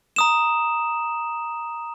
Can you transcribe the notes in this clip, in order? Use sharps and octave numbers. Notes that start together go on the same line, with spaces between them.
A#5 D#6 E7